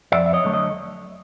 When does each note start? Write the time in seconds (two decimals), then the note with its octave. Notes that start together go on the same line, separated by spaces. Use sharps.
0.12 F2 D5 E5
0.26 E5
0.33 C#5 D#5
0.44 D3 F#3 A3
0.54 D#5